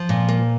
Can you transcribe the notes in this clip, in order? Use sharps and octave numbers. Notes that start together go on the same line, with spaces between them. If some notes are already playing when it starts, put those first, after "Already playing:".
Already playing: F3
A#2
A#3